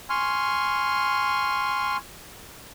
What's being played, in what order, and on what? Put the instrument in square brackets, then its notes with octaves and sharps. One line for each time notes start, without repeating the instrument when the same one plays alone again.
[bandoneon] G#5 C6 C#6 F6